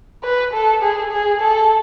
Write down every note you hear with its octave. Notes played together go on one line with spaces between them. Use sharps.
B4
A4
G#4
G#4
A4